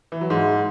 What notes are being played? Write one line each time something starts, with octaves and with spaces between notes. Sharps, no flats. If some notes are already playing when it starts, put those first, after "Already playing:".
E3
F#3
G#2